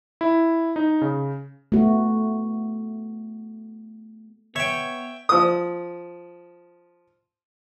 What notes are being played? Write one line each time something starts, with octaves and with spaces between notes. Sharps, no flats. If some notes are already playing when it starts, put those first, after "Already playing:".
E4
D#4
C#3
A3 B3 F#4
B3 C#5 E5 G5
F3 D#6